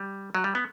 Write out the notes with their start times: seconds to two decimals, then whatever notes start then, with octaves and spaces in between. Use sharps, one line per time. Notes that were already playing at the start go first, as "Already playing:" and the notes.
Already playing: G3
0.35 F#3
0.44 G3
0.55 B3